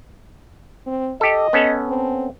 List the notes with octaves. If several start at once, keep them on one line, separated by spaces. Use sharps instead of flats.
C4
G4 A4 D#5
B3 C#4 A4
C4